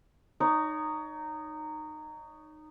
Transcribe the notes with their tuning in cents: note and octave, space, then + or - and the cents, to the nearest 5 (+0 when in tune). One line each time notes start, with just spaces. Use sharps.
D#4 -15 C#5 +25